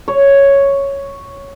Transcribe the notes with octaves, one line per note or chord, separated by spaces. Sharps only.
C#5